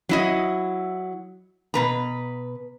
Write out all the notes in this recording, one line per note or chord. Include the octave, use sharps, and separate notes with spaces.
F#3 E4 D#5
B2 B4 A#5